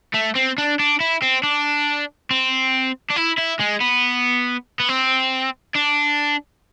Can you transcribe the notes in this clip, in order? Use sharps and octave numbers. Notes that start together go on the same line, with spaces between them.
A3
C4
D4
D4
E4
C4
D4
C4
D4
E4
E4
G#3
B3
B3
C4
D4